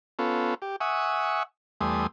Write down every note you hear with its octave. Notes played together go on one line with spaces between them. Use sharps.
B3 C#4 F4 A4
G4
E5 F#5 G#5 C#6 D#6
E2 G3 A3 G#5 C6 D#6